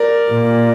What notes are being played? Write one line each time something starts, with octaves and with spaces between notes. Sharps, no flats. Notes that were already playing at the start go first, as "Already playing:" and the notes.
Already playing: A#4 D5
A#2